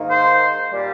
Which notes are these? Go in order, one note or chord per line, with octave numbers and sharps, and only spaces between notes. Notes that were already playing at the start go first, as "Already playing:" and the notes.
Already playing: G#2 D#3 A#3
C5
A#2 G3